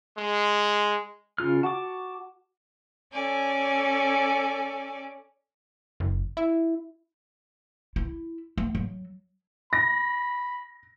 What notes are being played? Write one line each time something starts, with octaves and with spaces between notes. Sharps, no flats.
G#3
C#3 F4 F6
F#4 A5 D6
C#4 A4 D5 G#5
F#1
E4
E4
A3
F#3
B5 A#6